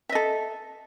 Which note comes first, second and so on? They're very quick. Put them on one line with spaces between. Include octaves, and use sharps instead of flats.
E5 D#5 A4